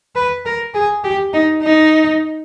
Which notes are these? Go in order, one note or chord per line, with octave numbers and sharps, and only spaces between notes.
B4
A#4
G#4
G4
D#4
D#4